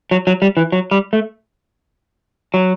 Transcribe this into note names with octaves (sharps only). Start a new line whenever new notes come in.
F#3
F#3
G3
E3
F#3
G3
A3
F#3